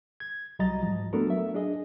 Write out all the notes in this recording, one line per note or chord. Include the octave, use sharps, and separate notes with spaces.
G#6
C2 F#3 G3 D#5 A#5 A6
G#2 F3
A3 B3 D4 F#4 A4 A#4
F#3 E5
D4 G#4 D#5